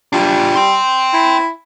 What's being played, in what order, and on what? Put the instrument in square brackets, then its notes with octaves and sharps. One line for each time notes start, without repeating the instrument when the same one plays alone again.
[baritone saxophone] G3 [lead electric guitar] D4 F4
[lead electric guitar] G5 C6
[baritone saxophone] E4